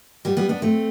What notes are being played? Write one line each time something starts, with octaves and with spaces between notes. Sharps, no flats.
G3 B3
G3 B3
B3 D4
A3 C4